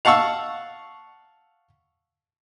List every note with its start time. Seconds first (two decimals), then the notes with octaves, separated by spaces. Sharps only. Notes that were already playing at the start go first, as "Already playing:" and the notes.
0.05 F5 F#5 A5 C#6 E6